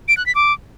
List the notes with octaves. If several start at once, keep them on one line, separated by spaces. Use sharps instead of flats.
D7
F#6
B6
D6